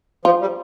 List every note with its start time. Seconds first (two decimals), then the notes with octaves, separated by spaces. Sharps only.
0.25 F3 F4
0.41 G3